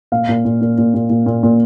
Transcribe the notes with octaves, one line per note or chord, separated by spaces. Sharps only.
A#2 F5
A#2
A#2
A#2
A#2
A#2
A#2
A#2
A#2